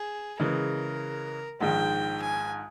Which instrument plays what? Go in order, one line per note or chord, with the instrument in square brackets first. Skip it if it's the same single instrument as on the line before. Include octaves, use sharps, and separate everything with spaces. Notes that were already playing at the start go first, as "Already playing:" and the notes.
Already playing: [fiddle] G#4
[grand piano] C#3 E3 G#3 [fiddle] A#4
[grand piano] A#1 G#2 D#3 G#3 [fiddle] G5
[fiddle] G#5